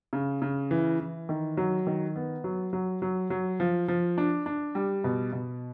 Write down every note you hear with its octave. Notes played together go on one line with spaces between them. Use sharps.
C#3
C#3
E3
E3
D#3
F#3
D#3
B3
F#3
F#3
F#3
F#3
F3
F3
D4
D4
G3
B2
B2